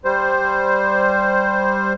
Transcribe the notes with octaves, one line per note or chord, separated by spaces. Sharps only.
G3 C5